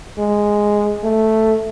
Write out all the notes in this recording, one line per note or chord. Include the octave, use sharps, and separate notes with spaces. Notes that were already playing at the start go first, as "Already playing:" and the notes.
G#3
A3